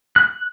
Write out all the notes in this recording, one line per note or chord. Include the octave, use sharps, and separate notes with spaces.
F#6